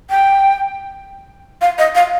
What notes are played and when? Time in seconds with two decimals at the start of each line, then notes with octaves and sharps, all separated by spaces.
0.10 G5
1.61 F5
1.78 D#5
1.95 F5